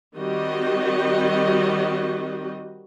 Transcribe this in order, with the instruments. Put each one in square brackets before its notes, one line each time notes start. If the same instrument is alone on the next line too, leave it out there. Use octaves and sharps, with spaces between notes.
[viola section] D#3 G3 C4 F#4 G4 D#5